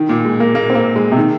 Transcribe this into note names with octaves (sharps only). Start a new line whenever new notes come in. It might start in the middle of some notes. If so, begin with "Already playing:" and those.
Already playing: D#3
A#2
G#3
A#3
A#3
C4
A#3
G#3
C3
D#3